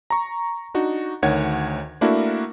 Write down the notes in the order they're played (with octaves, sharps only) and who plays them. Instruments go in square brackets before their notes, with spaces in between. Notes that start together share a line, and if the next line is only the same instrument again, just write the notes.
[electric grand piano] A#5 C#6
D4 D#4 F#4
D2 D#3 C#5 F#5 G#6
A3 A#3 D4 E4 F#4 A#4